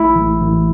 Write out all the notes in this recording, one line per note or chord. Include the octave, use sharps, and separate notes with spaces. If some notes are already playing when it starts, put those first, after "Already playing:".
Already playing: A1 A3 E4
A1
A1